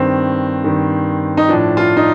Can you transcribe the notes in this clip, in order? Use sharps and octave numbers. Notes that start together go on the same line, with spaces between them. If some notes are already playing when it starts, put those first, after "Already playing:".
Already playing: G2 D#3 C4
G2 D#3
D#4
A2 F3 D4
F4
D#4